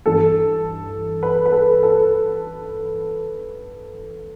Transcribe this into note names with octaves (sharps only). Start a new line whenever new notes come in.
G2 E3 A4
B4
B4
A4
A4